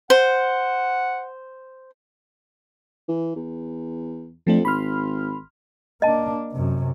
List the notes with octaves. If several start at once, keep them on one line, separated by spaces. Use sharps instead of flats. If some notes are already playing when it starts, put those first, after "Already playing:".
C5 F#5
E3
E2
F2 F3 A3 D4
G#1 B5 C6 F6
A#3 D4 D#5 A5
F#2 C3